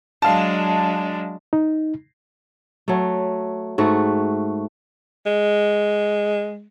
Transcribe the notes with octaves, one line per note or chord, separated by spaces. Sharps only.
F#3 G#3 D4 F5 A5
D#4
F#3 A3
G#2 A3 F#4
G#3